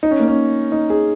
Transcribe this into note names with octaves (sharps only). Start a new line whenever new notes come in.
D#4
C#4
A#3
C#4
D#4
G#4